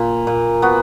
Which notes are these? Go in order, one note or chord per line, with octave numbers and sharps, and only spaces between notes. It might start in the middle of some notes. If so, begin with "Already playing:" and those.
Already playing: A#2
A#2
B3 F#4